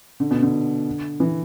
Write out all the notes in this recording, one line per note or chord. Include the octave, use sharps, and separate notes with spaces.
D3
B2
D3
E3